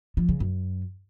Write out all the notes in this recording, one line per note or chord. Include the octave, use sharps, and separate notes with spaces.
F3
C#3
F#2